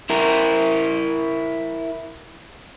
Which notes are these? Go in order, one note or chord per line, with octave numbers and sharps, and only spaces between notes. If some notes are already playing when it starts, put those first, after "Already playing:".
E4 A#4